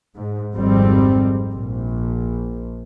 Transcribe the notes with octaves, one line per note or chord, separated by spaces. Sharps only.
G#2
G#1 F2 G#2 G3 C4
A#1